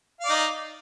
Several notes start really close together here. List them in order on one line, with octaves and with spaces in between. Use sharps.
F5 D5 D#4